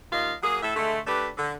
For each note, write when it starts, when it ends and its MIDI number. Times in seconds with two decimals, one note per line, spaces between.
0.12 0.34 39
0.12 0.34 58
0.12 0.34 65
0.12 0.34 75
0.12 0.34 77
0.43 0.60 54
0.43 0.60 58
0.43 0.60 68
0.63 0.73 45
0.63 0.73 69
0.63 0.73 76
0.76 0.99 50
0.76 0.99 56
0.76 0.99 57
1.07 1.29 57
1.07 1.29 62
1.07 1.29 67
1.07 1.29 71
1.38 1.54 50